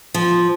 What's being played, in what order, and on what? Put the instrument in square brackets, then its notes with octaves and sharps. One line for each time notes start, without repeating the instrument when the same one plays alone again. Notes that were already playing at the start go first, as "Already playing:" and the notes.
[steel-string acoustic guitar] F3